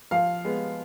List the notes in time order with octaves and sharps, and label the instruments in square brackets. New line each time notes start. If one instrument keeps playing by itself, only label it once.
[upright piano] F3 F5
G#3 B3